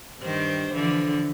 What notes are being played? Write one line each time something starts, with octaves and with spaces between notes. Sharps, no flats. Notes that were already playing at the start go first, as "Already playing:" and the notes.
G2 D#3 C5
D3 E3 F3